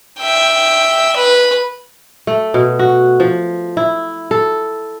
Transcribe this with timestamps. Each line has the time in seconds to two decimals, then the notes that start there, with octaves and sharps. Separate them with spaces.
0.19 E5 G5
1.17 B4
2.27 A3
2.54 B2
2.79 F#4
3.20 F3
3.77 E4
4.31 A4